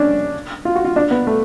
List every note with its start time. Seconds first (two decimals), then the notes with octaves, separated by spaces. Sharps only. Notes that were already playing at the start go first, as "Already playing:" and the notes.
Already playing: C#4 D4
0.65 F4
0.75 F#4
0.85 F4
0.96 D4
1.11 B3
1.27 A3